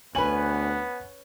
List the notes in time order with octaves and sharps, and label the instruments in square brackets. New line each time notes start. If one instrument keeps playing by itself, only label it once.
[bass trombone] D2 [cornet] B3 [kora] C#4 B4 [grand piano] G#5 F#7